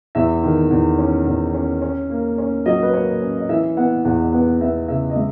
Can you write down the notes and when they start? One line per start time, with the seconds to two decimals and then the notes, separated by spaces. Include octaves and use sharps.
0.15 E2 E5
0.43 D#3
0.70 E2
0.98 C#4
1.26 E2
1.54 C#4
1.82 C#4
2.10 A#3
2.38 C#4
2.66 F#3 D#5
2.83 B4
2.93 A#3 C#5
3.21 C#4
3.38 D#5
3.49 E3 E5
3.77 B3 F#5
4.05 E2 F#5
4.33 B3 F#5
4.61 B3 E5
4.88 C#3 E5
5.10 D#5
5.16 G#3 E5